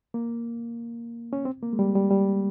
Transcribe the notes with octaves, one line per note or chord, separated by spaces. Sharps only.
A#3
C#4
C4
A#3
G#3
G3
G3
G3